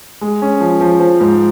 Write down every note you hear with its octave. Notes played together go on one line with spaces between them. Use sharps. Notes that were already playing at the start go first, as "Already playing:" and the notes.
G#3
C#4
F3
F3
F3
G#2